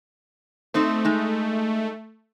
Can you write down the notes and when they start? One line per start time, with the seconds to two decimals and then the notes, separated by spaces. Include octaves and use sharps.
0.74 A3 C4 D#4 C5
1.05 G#3 D#4